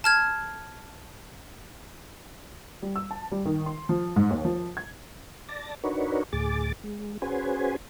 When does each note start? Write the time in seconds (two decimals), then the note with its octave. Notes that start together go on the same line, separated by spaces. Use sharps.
0.04 A5 F6 G#6
2.82 G3
2.96 E6
3.11 A5
3.32 G3
3.45 D#3
3.66 C6
3.89 F3
4.16 G#2
4.30 D#2
4.45 F3
4.77 G#6
5.49 D5 A5 A6 A#6
5.84 D4 D#4 F#4 A#4 B4 C#5
6.33 D2 A2 G#4 D6 A6
6.84 G#3
7.22 C#4 F#4 G#4 B4 C5 G#5